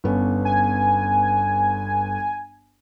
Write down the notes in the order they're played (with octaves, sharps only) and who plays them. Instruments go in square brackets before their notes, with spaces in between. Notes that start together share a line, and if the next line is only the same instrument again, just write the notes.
[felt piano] G1 B3 C#4
[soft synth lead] G#5